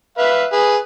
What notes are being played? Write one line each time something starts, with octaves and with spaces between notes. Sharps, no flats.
B4 E5 F5
G#4 B4